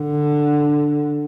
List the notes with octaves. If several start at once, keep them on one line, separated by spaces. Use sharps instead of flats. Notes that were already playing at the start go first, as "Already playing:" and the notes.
Already playing: D3